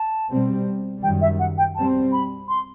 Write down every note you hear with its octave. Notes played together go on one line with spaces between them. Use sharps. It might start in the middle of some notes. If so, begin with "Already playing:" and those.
Already playing: A5
B2 G3 C4
F#2 D#3 G3 G5
E5
F#5
G5
B2 G3 C4 A5
B5
C6